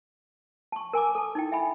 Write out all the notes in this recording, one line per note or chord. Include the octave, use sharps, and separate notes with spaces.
A5 C#6
A#4 G#5 A#5 D6
A4 A5
D#4 E4 G5
E5 G5 G#5 B5